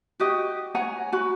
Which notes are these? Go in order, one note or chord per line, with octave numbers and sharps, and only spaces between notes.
F#4 G4 D#5
C#5 F#5 G#5 A#5
F#4 B5